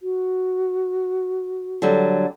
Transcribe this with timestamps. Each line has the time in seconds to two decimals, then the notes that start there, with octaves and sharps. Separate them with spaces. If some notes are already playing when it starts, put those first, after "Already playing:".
0.01 F#4
1.82 D3 F#3 G3